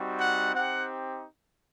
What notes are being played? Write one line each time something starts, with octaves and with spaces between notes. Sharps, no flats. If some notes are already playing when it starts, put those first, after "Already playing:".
Already playing: G3 C4 D#4 F#4
F#5
C4 D#4 G4 F#5